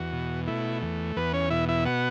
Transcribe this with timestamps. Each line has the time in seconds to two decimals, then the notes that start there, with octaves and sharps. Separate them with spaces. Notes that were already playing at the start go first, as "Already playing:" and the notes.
Already playing: E2 F#4
0.13 B2
0.47 A3 E4
0.82 E2
1.16 E2 B3 B4
1.33 C#4 C#5
1.50 B2 E4 E5
1.69 E4 E5
1.85 B3 F#4 F#5